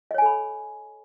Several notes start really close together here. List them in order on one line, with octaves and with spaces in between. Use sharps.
D#5 C#5 G#5 A4 B5